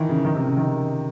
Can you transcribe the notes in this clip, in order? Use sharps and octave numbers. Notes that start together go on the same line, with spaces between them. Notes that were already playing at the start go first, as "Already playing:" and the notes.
Already playing: D#3 E3
C#3
D#3
C3
C#3
D#3